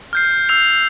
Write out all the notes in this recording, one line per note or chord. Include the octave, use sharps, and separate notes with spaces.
F6 G6 C7
E6 G6 C7 F7